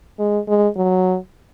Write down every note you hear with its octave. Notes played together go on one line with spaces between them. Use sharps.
G#3
G#3
F#3